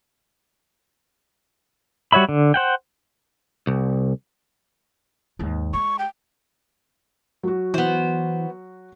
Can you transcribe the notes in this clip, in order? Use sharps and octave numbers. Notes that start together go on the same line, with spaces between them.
G3 F#4 C#5 E5 B5
D3
C5 F#5 G5
C2
D#2 G#2
G#3 C#6
G5
F#3 F#4
E3 B3 C5